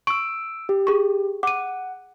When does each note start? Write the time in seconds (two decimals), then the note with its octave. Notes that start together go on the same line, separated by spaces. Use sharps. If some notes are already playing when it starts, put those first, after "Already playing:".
0.07 C#6 E6 D7
0.69 G4
0.87 G#4 C#6
1.43 F#5 D6 D#7